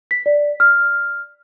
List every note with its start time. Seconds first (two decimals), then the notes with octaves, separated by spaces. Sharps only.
0.11 B6
0.26 D5
0.60 F6